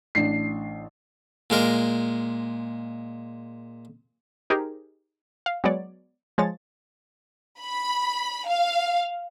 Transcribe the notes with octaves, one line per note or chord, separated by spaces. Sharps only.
A1 D4 C7
A#2 G#3 A#4
D#4 G4 G#4 A#4 C5
F5
F#3 G#3 B3 C#5 D5
F3 G#3 C#5 A6
B5
F5